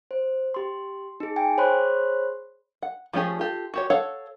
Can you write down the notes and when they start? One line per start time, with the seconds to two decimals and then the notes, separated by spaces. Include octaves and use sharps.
0.11 C5
0.54 G4 C6
1.20 D#4 G#4
1.36 G5 G#5
1.57 G#4 C5 C#5 B5 C6 F#6
2.82 F#5
3.13 F3 A3 C#4 G4 G#4
3.39 F4 G4 A4
3.74 F#4 G4 C#5
3.90 A4 C#5 F5 F#5